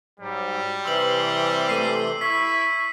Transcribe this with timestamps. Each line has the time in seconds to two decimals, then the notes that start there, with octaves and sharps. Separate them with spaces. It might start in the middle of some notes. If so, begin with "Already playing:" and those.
0.20 G#2 F#3 G3
0.85 C3 E3 C6 E6 F#7
1.69 A3 C7 D#7
2.21 E4 C#6 B6